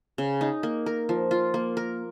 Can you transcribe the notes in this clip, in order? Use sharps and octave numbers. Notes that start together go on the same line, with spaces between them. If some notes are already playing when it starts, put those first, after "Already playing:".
C#3
D#4
A#3
A#4
F3
F4
A#3
A#4